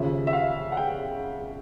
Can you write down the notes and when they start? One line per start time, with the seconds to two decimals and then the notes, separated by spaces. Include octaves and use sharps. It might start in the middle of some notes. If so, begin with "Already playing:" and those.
Already playing: D#2 C#3 F3 E5
0.27 E5
0.33 F5
0.72 F#5
0.77 G5